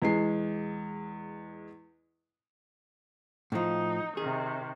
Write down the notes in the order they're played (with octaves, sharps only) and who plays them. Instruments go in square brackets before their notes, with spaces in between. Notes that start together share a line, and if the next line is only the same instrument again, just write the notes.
[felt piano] E2 G#3 C7
[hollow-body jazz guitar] A2 F3 [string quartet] D#4
[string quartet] C3 D#3 [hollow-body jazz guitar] G#4